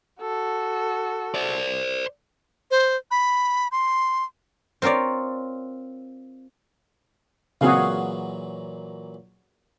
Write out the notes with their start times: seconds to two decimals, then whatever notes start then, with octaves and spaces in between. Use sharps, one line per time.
0.21 F#4 A4
1.34 C5 D5
2.71 C5
3.11 B5
3.72 C6
4.82 C4 F4 A#4 C#5 D5
7.61 A#2 C#3 E3 F#3 C4 F#4 G#4 F5